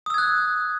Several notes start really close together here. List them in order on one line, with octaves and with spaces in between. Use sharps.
D#6 E6 G#6 F#6